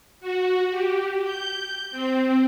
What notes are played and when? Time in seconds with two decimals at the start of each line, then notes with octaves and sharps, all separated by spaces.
0.21 F#4
0.71 G4
1.24 G6
1.91 C4